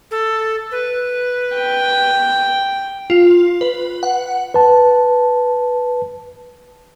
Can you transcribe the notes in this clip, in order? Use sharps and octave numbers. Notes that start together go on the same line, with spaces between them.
A4
B4
G5
F4
B4
F#5
B4 A5